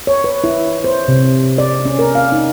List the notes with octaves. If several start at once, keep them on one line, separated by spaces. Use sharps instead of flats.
C#5
B4
E4
C5
C3
D5
C#4
A#4
F5
D#4